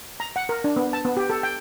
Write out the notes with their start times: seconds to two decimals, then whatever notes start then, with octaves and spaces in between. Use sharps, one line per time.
0.20 A#5
0.36 F#5
0.49 A#4
0.64 D4
0.76 B3
0.93 A5
1.05 B3
1.17 G4
1.30 A4
1.43 G5